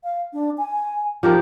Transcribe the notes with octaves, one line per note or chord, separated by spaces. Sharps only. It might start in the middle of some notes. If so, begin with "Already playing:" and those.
F5
D4
G#5
F3 D#4 G4 A#4